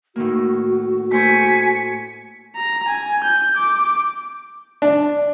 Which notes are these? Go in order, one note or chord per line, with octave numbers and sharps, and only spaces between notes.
A2 D#3 A#3 F#4
A3 C5 G#5 B6 C#7
A#5
G#5
G6
D6
D4